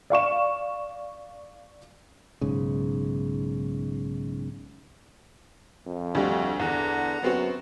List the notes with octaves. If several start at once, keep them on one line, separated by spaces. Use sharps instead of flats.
D5 F5 C#6 E7
B1 G#2 C#3
F2
D2 G3 F#4
E2 D3 F#5 A#5
F#2 B3 C4 F#4